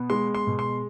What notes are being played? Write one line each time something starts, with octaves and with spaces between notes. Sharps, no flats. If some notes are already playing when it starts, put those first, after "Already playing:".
Already playing: B2 B3
G#3 C6
C6
B2
C6